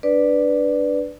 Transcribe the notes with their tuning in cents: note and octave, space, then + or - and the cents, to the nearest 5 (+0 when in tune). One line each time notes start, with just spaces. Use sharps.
D4 +5 B4 +0 D5 +0